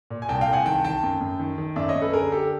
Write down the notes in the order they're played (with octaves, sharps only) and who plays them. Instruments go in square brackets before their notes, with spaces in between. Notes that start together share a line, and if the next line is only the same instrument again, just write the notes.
[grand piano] A#2
G#5
C2 G5 A5
F5 G5
C2
F#5 G#5
D#3 G5 A5
D#3 G5 A5
F#2
F#2
D#3
D#3
F#2 D5 E5
C#5 D#5
F#2
A4 B4
D3 G#4 A#4
D3 G4 A4